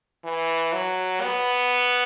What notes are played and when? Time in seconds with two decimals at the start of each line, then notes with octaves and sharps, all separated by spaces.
0.24 E3
0.73 F#3
1.22 B3